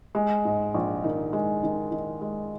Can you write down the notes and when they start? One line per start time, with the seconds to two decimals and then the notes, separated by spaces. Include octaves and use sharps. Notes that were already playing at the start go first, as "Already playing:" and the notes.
0.15 G#3
0.45 G#2
0.74 A#1
1.04 D#3
1.33 G#3
1.63 D#3
1.92 D#3
2.21 G#3